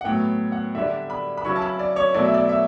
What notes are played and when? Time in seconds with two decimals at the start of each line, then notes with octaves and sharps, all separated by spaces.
0.01 F#5
0.05 A2 F#3 B3 G5
0.52 F#5
0.75 D3 G3 D4 E5
1.10 B5
1.37 B5
1.45 C#3 F#3 C#4 E4 C#6
1.56 A5
1.62 B5
1.79 D5
1.96 C#5
2.14 B2 F#3 A3 E4 D5
2.25 E5
2.34 D5
2.49 E5